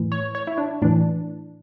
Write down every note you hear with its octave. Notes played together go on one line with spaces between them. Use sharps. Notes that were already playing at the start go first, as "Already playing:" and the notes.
Already playing: A2 E3
C#5
C#5
E4
D4
A2 E3 D4